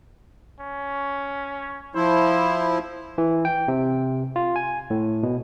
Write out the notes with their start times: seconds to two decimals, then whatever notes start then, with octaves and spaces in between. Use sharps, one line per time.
0.60 C#4
1.95 F3 E4 C5
3.18 E3
3.45 G5
3.68 C3
4.36 F4
4.56 G#5
4.90 A2
5.23 B2